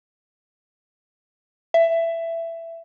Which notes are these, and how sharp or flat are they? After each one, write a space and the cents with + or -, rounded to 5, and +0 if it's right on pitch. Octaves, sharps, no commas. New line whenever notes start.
E5 +15